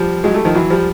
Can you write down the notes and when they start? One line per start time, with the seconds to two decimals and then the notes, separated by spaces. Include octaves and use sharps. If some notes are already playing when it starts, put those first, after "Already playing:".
Already playing: F3 G3
0.24 F#3 G#3
0.34 G3 A3
0.45 D#3 F3
0.55 E3 F#3
0.70 F3 G3